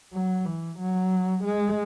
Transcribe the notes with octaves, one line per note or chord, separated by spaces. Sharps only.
F#3
E3
F#3
G#3